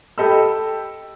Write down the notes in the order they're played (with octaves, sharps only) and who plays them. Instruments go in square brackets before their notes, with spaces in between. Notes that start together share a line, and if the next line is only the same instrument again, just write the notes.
[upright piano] G4 A4 D#5 B5 E6